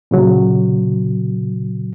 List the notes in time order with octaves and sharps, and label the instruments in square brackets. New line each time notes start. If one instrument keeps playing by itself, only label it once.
[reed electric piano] A#2 C#3 F#3